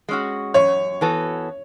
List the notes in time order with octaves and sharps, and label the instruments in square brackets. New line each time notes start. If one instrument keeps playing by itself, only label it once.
[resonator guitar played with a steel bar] G#3 C#4 F#4
[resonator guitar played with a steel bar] F#2 [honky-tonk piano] C#5
[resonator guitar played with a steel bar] E3 B3 F#4 A4